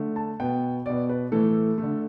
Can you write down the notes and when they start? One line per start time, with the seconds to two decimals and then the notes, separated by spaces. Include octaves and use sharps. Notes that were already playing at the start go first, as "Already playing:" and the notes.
Already playing: D3 A3
0.16 A5
0.40 B2 B3 G5
0.86 B2 B3 D5
1.09 B4
1.32 A2 E3 A3 A4
1.78 A3
1.83 D3